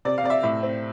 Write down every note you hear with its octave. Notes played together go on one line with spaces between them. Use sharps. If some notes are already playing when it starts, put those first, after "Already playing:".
C3 D5
F5
C3 D5
E5
A2 E5
C4